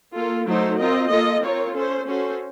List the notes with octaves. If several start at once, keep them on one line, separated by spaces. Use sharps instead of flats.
A#3 F4 A4
F#3 A3 D#4 A4 C5
C4 F4 A#4 D#5
A#3 F4 A4 D#5
C4 F4 A#4 C#5
C#4 A4 C5
C#4 F#4 A4 C5